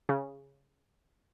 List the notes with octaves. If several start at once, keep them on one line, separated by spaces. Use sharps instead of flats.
C#3